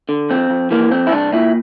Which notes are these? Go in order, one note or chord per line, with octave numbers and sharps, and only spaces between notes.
D3
F2 C4
F2
E3 A#3
F2 C4
E4
C2 D4
A#2 E4